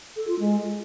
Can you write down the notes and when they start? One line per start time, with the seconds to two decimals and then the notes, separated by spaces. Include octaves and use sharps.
0.16 A4
0.28 F4
0.39 G#3